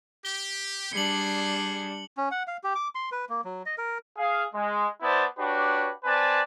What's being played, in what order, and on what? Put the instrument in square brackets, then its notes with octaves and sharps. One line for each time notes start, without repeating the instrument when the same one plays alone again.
[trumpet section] G4 [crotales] G7
[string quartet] G3 D4 [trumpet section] G#4 [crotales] C#7 F#7
[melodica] C#4
F#5
F5
G4
D6
C6
B4
A#3
F#3
D#5
A#4
[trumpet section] G#4 F5
G#3
B3 E4 C5 D5 A5
D4 F#4 G4 B4 C#5
C4 B4 D5 G#5 A5